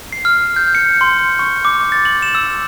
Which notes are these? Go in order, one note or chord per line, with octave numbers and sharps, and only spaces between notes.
C7
F6
G6
C#7
C6
C#6
D6
A6
F#7
E7
E6